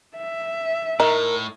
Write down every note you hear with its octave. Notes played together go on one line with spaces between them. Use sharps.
E5
A2 D#4 A#4